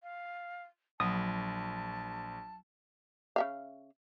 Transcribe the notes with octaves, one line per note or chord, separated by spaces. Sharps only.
F5
A#1 F#3 A5 D#6
C#3 E5 F5